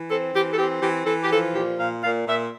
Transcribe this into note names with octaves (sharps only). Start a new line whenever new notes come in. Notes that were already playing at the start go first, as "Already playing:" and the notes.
Already playing: E3
C4 A4
E3 G4
A4
C4 G4
E3 G4
E3 A4
G4
F3 A4
A#2 G4
A#2 F5
A#2 F5
A#2 E5